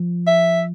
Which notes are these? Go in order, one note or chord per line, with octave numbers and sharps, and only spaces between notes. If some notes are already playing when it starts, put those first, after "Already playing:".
Already playing: F3
E5